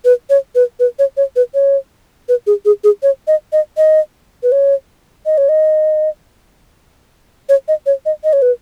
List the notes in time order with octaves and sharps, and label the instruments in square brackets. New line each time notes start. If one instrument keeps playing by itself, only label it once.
[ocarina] B4
C#5
B4
B4
C#5
C#5
B4
C#5
B4
G#4
G#4
G#4
C#5
D#5
D#5
D#5
B4
C#5
D#5
C#5
D#5
C#5
D#5
C#5
D#5
D#5
C#5
B4